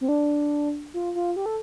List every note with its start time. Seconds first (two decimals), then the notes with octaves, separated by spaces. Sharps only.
0.01 C4
0.08 D4
0.94 F4
1.15 F4
1.36 G4
1.46 A4